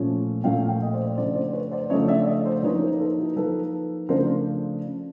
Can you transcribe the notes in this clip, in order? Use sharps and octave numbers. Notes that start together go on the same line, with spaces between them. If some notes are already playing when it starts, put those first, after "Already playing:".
Already playing: A#2 F3 A3 C#4
A#2 F3 A3 C#4 F5 G5
F5 G5
D#5
C5 D5
C#3 F3 A3 D4 C5 D5
C5 D5
B4 C#5
C5 D5
C#3 F3 A3 D4 C#5 D#5
D5 E5
C#5 D#5
C5 D5
F3 A#3 D#4 B4 C#5
A#4 C5
A4 B4
E4 F#4
F3 A#3 D#4 A4 B4
C#3 F3 A3 D4 A#4 C5